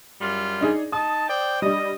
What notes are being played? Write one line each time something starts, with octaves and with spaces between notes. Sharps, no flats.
F#2 G3 F4
D4 D#4 G#4
D#4 A5 D#6
C5 D5 G5
G3 D4 D#5